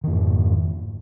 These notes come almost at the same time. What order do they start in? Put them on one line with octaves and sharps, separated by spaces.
D#3 F2 G#2